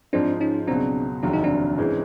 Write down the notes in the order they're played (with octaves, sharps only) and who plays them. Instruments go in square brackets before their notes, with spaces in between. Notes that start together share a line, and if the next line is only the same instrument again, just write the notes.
[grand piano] G#2 F3 G#3 [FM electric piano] C4 D4
[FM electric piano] C#4 D#4
[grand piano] C#2 B2 F#3 [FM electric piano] C4 D4
[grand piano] F1 D#2 C#3 F#3 [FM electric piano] D4
[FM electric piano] D#4
C4 D4
[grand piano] G#2 E3 G#3 C#4